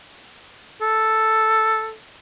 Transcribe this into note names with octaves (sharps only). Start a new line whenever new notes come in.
A4